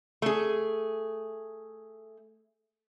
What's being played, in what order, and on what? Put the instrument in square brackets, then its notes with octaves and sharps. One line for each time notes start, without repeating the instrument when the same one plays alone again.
[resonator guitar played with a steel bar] A3 G#4